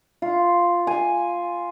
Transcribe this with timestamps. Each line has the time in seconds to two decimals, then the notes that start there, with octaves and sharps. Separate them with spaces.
0.22 F4
0.87 G#5